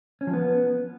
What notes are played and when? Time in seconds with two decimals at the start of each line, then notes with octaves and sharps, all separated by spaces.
0.21 C#4
0.27 F3
0.33 B3